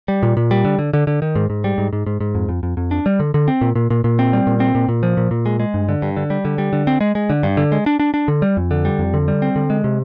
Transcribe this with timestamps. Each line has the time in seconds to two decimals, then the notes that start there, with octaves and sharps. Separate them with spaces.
0.08 G3
0.23 A#2
0.37 A#2
0.51 G3
0.65 D3
0.79 D3
0.93 D3
1.07 D3
1.22 D#3
1.35 G#2
1.50 G#2
1.64 G3
1.78 G#2
1.93 G#2
2.06 G#2
2.20 G#2
2.35 F2
2.49 F2
2.63 F2
2.77 F2
2.91 D4
3.06 G3
3.20 D3
3.34 D3
3.48 C4
3.61 A#2
3.75 A#2
3.90 A#2
4.04 A#2
4.19 C4
4.33 G3
4.47 A#2
4.60 C4
4.75 A#2
4.89 A#2
5.03 F3
5.17 A#2
5.31 A#2
5.46 G#3
5.60 G#3
5.74 G2
5.89 D3
6.02 G2
6.17 D3
6.30 G3
6.45 D3
6.58 G3
6.73 D3
6.87 C4
7.01 G#3
7.15 G#3
7.30 D3
7.43 G2
7.57 D3
7.72 G#3
7.86 D4
8.00 D4
8.14 D4
8.28 D3
8.42 G3
8.57 F2
8.71 D3
8.85 G3
8.99 F2
9.14 D3
9.28 G3
9.42 C4
9.56 D3
9.70 G#3
9.84 C3